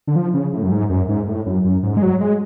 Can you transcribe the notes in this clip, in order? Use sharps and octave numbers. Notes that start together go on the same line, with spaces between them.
D3
F3
C#3
A2
F#2
G#2
F#2
G#2
A2
F#2
F#2
G#2
G#3
F#3
G#3